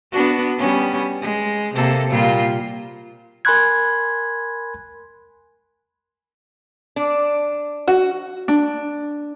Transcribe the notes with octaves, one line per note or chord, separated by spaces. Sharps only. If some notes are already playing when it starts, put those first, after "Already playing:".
B3 D4 F#4
G3 B3 C#4
G#3
C3 A#3 A4
A#2 G3 F4
A#4 G#5 B5 C6 F#6 G#6
D4
F#4
D4